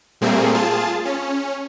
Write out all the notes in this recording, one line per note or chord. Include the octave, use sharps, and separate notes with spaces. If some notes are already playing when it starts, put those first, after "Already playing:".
A#2 G3 A3 A#3 C4 G#4
F4 G#4 A5
C#4